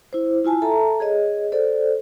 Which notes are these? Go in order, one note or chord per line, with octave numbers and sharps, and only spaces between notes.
E4 C5
E4 F4 G#5 A5
A4 E5 A5 A#5
G#4 C#5 D#5
A4 C5 D5